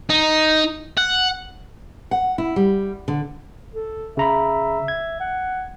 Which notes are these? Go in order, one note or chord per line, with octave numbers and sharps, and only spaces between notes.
D#4
F#5
F#5
E4
G3
D3
A4
C#3 E5 A#5 B5
G#6
F#5